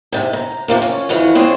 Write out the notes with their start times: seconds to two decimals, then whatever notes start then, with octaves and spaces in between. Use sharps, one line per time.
0.12 G#2 C3
0.33 A#5
0.68 C3 F3 A#3
0.82 C#4
1.09 F2 E3 F#4 B4
1.35 D3 G#3 C4 C#4